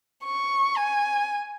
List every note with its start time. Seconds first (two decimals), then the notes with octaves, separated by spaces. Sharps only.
0.25 C#6
0.77 G#5